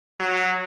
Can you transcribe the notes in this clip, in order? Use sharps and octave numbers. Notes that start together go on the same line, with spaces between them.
F#3